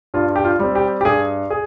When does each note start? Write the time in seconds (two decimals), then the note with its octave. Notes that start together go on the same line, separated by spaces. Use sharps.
0.14 G2 F4
0.36 G4
0.44 F4
0.59 G3 C4
0.75 G4
1.01 G4
1.05 G2 G#4
1.50 G#4